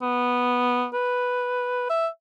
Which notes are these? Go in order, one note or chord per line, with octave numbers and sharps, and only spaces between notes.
B3
B4
E5